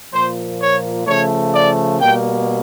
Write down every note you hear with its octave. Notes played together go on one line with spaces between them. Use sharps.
A#2 F3 A#3 C5
C#5
C#3 F3 A3 C#5
D5
B2 G3 A#3 G5